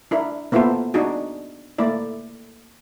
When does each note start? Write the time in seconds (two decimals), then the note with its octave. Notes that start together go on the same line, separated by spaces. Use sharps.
0.11 D4 E4 A#4
0.52 A#3 B3 E4 F4 A4 C5
0.94 D4 D#4 F#4 G#4
1.78 A3 A#3 E4 D5